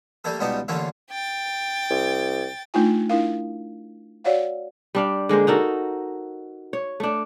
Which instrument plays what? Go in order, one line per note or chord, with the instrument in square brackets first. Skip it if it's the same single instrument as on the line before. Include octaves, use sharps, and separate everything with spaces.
[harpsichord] G3 A3 A#3 A4
C#2 B2 G3 B3 D#4 A5
A1 D3 A3 A#3 C#4 F4
[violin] G5 A6
[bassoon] C2
[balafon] A3 D4 D#4 F4 G#5
D4 E4 A#4 F5
F#4 C#5 D5 F5 F#5
[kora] G3 D4 F5
D3 G#3 A#3 C5
D#4 F#4 A4 A#4
C#5
A3 D4